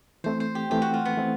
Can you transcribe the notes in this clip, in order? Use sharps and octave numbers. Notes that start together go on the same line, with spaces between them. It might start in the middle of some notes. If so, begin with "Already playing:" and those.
E3 A3 C4 C5
C5
G4
E3 A3 C4 G4
F#4
F4
B3
E3 A3 C4